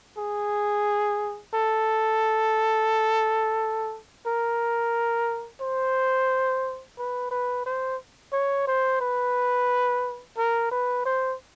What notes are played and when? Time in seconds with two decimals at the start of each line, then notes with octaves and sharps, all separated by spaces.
0.18 G#4
1.54 A4
4.27 A#4
5.61 C5
6.98 B4
7.31 B4
7.66 C5
8.33 C#5
8.67 C5
9.01 B4
10.37 A#4
10.72 B4
11.06 C5